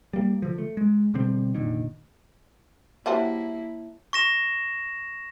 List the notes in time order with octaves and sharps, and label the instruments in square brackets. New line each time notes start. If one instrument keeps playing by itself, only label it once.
[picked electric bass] G3 A#3
D3 F3
A3
G#3
B2 D3 G3 C4
F1 A#2 D3 D#3
[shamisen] G3 F#4 C5 [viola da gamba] A#3 E4 [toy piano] C#5 E5 A5
[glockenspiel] C#6 A#6 E7